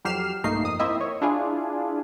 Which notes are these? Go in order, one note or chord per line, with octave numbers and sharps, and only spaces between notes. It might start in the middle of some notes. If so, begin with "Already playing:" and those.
F2 F#3 G4 F6 C7 E7
B1 G2 A3 A#3 D#4 C7
F2 D#6
A#3 C4 E4 D#5 E5
C#5
D4 E4 F4 G#4